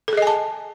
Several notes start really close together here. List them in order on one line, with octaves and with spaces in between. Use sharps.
A4 G#4 D#5 G#5 A5